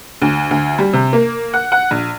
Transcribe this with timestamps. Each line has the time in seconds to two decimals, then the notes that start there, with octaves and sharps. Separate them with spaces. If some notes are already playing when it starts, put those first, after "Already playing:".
0.22 D2
0.51 D2
0.79 G3
0.93 C3
1.13 A#3
1.54 F#5
1.72 F#5
1.91 A#1